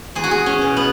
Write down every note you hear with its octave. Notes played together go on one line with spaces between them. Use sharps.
E2 G#4
F#4
G#4
C#4
B2
B3